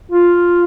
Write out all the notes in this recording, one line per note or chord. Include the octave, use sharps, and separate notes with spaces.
F4